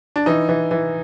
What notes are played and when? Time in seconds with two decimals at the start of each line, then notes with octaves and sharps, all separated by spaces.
0.16 D4
0.26 E3 D#4
0.49 E3
0.71 E3